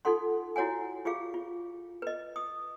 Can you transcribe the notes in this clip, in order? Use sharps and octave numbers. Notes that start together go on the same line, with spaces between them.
D#4 F4 A4 F#5 C6
E4 F#4 C#5 F#5 G#5
F4 G4 G#4 F5
F4
B4 D#5
D#6